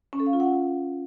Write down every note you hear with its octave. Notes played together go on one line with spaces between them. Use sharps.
C#4
A4
F5
F4
F#5